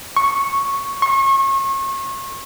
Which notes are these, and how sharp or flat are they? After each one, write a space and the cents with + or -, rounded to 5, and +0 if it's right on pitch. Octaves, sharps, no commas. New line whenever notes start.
C#6 -5
C#6 -35